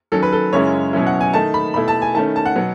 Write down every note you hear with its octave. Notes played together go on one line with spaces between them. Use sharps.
D#3 F#3 C#4 A4
B4
A4
F#2 C#3 G#3 C#4 E4 C#5
B2 F#3 C#4 E4
F#5
G#5
D#3 A3 D#4 A5
B5
B2 A3 E4 B5
A5
G#5
D#3 A3 C#4 A5
A5
F#5
B2 F#3 B3